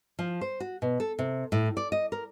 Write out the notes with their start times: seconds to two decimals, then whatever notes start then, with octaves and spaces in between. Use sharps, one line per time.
0.19 F3
0.41 C5
0.60 F#4
0.82 B2
1.00 A4
1.19 C3
1.52 A2
1.77 D5
1.92 D#5
2.12 A#4